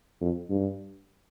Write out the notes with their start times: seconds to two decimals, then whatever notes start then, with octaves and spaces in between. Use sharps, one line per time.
0.21 F2
0.50 G2